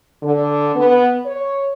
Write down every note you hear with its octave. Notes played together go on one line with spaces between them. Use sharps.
D3
B3
C#5